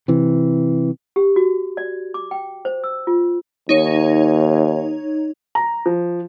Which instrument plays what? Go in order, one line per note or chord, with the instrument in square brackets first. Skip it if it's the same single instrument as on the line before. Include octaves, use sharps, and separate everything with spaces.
[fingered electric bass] C3 E3
[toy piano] G4
F#4
D5
D6
G5
C5
E6
F4
[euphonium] D#2 [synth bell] D#4 C#5
[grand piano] A#5
F3